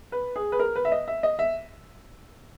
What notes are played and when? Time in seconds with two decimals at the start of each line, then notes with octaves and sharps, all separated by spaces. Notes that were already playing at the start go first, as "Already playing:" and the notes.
0.12 B4
0.36 G#4
0.52 B4
0.60 A#4
0.76 B4
0.85 E5
0.92 D#5
1.08 E5
1.23 D#5
1.39 E5